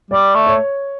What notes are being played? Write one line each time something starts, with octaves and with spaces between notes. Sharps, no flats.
G3 D5
A3
C#5